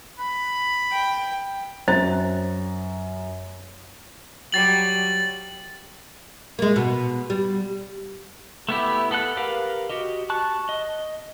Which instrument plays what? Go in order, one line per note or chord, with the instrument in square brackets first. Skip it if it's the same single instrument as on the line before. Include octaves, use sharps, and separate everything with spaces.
[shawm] B5
[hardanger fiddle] G5
[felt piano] F#2 A#5 A6 [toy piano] C5
[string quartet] F#3 G3 [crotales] A6 F#7
[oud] G#3 A#3
B2
G3
[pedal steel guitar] A3 B3 E4 G4
B3 A4 F#5 F#6
G4 A#4 B4 F5
F#4 G4 D#5
A5 C#6 F#6
D#5